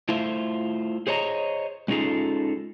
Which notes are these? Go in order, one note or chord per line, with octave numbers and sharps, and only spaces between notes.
A3 E4 F4 C5 E5
G#4 C5 C#5 D#5 A#5
G#3 C#4 D#4 F4 G#4 A4